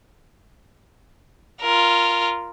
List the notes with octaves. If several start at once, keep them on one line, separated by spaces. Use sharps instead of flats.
F4 A#4